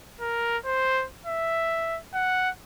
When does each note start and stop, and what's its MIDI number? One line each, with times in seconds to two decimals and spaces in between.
0.21 0.58 70
0.65 1.06 72
1.25 1.99 76
2.14 2.50 78